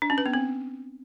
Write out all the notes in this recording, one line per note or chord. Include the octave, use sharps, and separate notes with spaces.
D4
C#4
B4
B3
C4